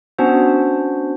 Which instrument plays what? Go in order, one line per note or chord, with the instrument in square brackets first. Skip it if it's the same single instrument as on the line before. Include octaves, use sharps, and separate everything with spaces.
[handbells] B3 C#4 D4 F#4 C5